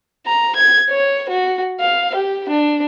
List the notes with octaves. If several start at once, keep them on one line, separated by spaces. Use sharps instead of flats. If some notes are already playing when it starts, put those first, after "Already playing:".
A#5
G#6
C#5
F#4
F5
G4
D4